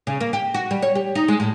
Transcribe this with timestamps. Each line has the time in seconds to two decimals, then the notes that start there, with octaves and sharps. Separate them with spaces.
0.07 C#3
0.21 A#3
0.33 G4
0.54 F#4
0.71 G3
0.82 C#5
0.95 G4
1.15 D#4
1.28 G#3
1.40 A2